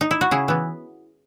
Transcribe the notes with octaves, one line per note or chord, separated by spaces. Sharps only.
D#4
E4
F#4
C#3 E4 G#4
E3 B3